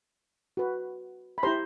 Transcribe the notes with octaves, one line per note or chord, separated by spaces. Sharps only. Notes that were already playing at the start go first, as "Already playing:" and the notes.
F#4 B4
B5
E4 G4 C5 A#5 C6